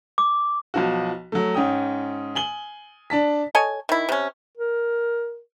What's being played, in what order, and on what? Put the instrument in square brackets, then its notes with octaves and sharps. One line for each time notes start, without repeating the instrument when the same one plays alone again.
[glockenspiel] D6
[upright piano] B1 F3 F#4
F#3 A3
G#2 C#4 G5 D#6
G#5 F#7 G7
D4 A5 B6
[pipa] A4 C#5 D#5 G#5
D#3 E4
C3 C#4
[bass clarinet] A#4